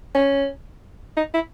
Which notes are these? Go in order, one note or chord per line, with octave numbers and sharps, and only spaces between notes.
C#4
D#4
E4